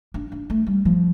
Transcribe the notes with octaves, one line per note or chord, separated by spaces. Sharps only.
D4
D4
A3
G3
F3